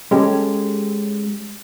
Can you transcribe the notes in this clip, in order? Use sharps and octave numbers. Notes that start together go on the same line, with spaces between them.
G#3 C#4 G4 A4